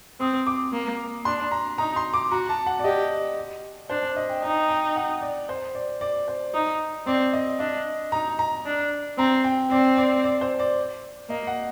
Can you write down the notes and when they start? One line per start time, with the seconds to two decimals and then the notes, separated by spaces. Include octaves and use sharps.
0.20 C4 D#6
0.47 D6
0.73 A#3
1.25 D4 C6
1.51 A#5
1.78 D#4 A#5
1.96 C6
2.14 D6
2.31 F#4 A#5
2.49 A5
2.66 F#5
2.79 D5
2.84 G4 D#5
3.90 D4 C5
4.03 D5
4.16 D#5
4.29 G5
4.43 D#4 G5
4.69 G5
4.96 F#5
5.21 D5
5.49 C5
5.75 D5
6.01 D5
6.28 C5
6.54 D#4
7.07 C4 D5
7.33 D#5
7.60 D4 D#5
8.12 D#4 A#5
8.39 A#5
8.66 D4
9.18 C4 A#5
9.44 G5
9.71 C4 D5
9.98 D5
10.24 D5
10.41 C5
10.59 D5
11.29 A#3 D#5
11.47 F#5